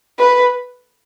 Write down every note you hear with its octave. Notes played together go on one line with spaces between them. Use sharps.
B4